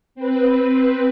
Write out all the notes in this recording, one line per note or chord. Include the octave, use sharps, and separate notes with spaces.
C4 B4